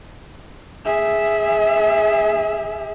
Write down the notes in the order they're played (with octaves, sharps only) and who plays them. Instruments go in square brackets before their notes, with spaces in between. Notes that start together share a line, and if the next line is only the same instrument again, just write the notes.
[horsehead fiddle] G#4 E5